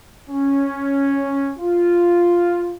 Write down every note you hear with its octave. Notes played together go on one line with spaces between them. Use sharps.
C#4
F4